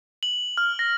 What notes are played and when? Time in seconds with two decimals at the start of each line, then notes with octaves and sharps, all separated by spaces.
0.23 F#7
0.57 F6
0.79 A#6